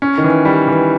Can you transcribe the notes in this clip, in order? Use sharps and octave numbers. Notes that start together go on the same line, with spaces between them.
C#4
D#3
E3
G3
E3